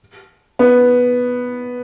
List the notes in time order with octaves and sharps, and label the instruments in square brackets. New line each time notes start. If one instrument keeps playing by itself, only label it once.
[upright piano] B3